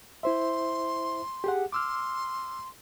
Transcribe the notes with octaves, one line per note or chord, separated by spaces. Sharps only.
E4 C5 E5 C6
G4 G#4 F#5
C6 D6 E6 F6